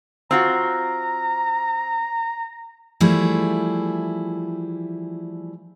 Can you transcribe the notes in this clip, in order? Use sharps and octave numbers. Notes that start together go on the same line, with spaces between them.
C4 F4 F#4 A#5
E3 F3 G3 A3 E4 G#4